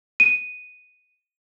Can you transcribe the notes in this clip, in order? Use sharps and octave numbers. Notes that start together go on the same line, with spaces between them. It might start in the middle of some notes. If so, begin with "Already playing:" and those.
D#7